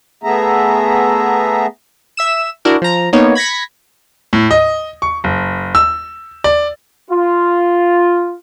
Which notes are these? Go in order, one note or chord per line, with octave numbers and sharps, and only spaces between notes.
A3 B3 G#4 E5 A#5
E5 E6 E7
D4 E4 F#4 A#4
F3 A#5
A#3 B3 D#4 C#5
B5 G#6 A#6 B6 C#7
A2
D#5
C#6
F#1
E6
D5
F4